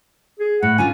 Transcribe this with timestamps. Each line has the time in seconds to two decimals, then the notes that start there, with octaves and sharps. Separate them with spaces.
0.40 G#4
0.63 A2 F#5
0.78 D3 C#4 F4 G#5